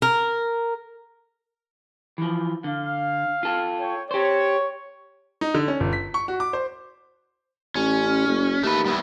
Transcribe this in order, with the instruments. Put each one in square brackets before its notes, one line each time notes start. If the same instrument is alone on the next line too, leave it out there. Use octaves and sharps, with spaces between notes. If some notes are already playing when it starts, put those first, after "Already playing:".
[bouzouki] A#4
[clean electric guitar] E3 F3
[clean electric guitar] D3 [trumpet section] F5
[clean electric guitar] F4 A4
[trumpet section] C#5 G5
[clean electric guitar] G4 C5 [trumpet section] C#5
[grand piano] D#4
D3
C#4
G1
B6
C#6
F#4
D6
C5
[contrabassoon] A1 [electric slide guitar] C#4
[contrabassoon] F#1
[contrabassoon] D#2 [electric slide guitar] A3 B4
[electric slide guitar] G3 B3 E4